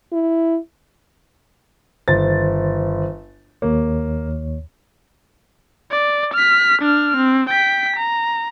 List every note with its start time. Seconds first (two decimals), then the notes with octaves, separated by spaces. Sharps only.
0.12 E4
2.08 G1 D#3 C5 A6
3.62 D#2 A#3 C#5
5.91 D5
6.34 F6 B6
6.82 D4 F6
7.17 C4
7.49 G5 B6
7.96 A#5